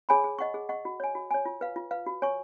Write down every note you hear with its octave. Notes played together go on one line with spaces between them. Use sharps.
G#4 C#5 G#5 B5
G#4
D#5 F#5 C#6
G#4
D#5 F#5 C#6
F#4
C#5 G#5
F#4
C#5 G#5
F4
B4 F5
F4
B4 F5
F#4
C#5 G#5 C#6